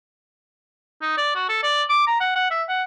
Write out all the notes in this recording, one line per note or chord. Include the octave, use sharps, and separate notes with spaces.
D#4
D5
F#4
A4
D5
D6
A#5
F#5
F#5
E5
F#5